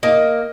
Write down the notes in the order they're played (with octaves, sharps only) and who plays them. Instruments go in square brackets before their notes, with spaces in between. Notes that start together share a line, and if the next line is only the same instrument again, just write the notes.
[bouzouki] A#3 [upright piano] D#5